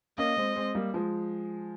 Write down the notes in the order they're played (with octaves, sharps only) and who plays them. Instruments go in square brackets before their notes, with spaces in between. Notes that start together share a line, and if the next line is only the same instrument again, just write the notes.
[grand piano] A#3 C#4 [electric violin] D#5
[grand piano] G#3 C4
G#3 C4
G3 A#3
F3 G#3